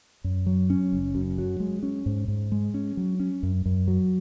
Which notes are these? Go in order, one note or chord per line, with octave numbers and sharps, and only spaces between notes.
F#2
F#3
C#4
F#1
F#2
F#3
G#3
C#4
G#2
G#2
G#3
C#4
F#3
C#4
F#2
F#2
F#3